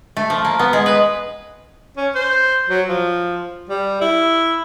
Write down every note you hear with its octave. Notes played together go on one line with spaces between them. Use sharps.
A3
F3
A#3
B3
G#3
B4
C#4
C5
F#3
F3
G3
E4